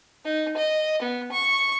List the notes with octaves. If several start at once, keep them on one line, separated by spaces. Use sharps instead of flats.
D#4
D#5
B3
C#6